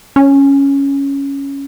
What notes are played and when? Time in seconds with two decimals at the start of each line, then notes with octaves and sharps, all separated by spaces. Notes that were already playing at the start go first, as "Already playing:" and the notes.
0.16 C#4